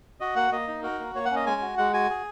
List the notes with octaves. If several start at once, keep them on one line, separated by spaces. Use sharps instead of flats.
F#4 D#5
A#3 F#5
A#3 D#5
D#4
F#4 A#4
A#3
A#3 C#5
F#5
C#4
D#5
G#3 G#5
F#4
G#3 F#5
F#4 G#5
G#4